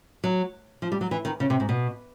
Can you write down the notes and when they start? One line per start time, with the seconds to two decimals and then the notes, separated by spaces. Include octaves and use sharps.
0.24 F#3
0.82 F3
0.92 G3
1.01 F#3
1.11 E3
1.25 D#3
1.40 C#3
1.50 C3
1.60 G#2
1.69 B2